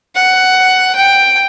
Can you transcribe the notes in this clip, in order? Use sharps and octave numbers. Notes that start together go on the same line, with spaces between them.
F#5
G5